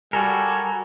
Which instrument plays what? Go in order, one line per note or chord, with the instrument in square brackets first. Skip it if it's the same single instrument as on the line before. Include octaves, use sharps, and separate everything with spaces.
[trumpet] G3 [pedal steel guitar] F#4 A4 A#4 [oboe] G#5